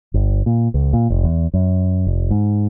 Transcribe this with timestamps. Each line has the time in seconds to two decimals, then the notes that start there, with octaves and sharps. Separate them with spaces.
0.14 G1
0.46 A#2
0.74 C#2
0.93 A#2
1.10 F1
1.24 E2
1.54 F#2
2.07 F1
2.30 G#2